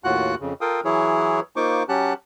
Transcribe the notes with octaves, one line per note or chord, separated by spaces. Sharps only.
D#2 A2 F4 F#4 F#5 F#6
F2 C#3
F4 A4 A#4 F5 G5 D#6
E3 F#3 E4 G#4 C#5
A#3 D#4 F4 C5 C#6 D6
F#3 C#4 G4 F#5 A5 F#6